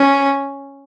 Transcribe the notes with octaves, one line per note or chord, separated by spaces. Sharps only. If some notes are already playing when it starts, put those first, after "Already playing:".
Already playing: C#4